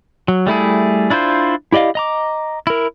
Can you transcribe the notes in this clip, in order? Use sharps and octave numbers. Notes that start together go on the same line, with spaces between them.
F#3
G3 A3 E4 G#4
D4 E4 F4 C5 G6
E4 G4 D5 D#5 F5
D#5 A#5 D6
E4 A#4